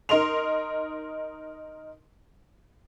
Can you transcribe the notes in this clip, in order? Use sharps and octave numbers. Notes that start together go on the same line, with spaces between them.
D#4 A#4 D#5 C6 F7